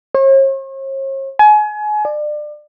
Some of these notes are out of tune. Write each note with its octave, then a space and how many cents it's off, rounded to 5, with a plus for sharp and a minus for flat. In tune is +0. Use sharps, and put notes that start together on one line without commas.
C#5 -45
G#5 +30
D5 +30